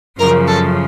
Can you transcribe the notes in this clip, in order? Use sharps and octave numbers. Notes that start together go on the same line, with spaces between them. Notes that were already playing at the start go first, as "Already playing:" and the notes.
F#2 C#3 F3 A#4
A4